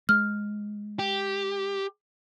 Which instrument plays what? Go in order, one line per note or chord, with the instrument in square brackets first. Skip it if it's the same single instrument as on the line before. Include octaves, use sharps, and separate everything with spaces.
[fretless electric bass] G#3 [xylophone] F6
[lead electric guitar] G4